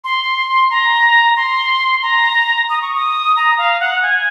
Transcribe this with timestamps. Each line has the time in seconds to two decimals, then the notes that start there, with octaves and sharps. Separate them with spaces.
0.04 C6
0.70 A#5
1.36 C6
2.02 A#5
2.69 D#6
2.82 C#6
2.94 D#6
3.36 A#5
3.58 F5
3.80 F#5
4.02 G#5